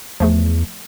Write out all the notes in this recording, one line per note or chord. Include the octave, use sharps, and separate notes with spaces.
E2 F3 A3 G#4